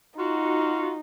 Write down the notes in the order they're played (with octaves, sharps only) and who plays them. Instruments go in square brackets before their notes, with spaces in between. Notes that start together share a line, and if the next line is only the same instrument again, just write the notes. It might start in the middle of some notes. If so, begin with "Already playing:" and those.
[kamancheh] D#4 [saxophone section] F4 F#4